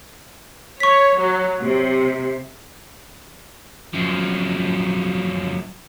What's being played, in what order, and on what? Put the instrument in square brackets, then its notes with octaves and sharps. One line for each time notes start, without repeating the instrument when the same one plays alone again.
[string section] C#5 [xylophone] C#6 B6
[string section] F#3
C3
[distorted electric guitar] F#2 F3